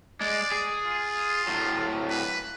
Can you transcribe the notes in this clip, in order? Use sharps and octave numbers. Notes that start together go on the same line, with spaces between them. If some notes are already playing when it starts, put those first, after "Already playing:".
G#3 D5
G#4
F4
A2 F#3
B4